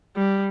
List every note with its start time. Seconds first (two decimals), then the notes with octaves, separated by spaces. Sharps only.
0.17 G3